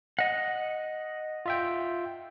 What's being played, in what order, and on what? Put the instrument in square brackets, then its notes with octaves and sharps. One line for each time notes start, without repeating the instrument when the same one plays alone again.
[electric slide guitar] D#5 F#5
[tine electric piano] F4 E5 G5